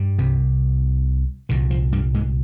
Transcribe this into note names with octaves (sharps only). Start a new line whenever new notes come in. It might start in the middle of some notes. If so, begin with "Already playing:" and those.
Already playing: G2 G3
C2 C3
C2 A#2 D#3
F3
G2 G3
G#2 G#3